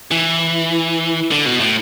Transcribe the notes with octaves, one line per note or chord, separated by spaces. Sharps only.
E3
D3
B2
A2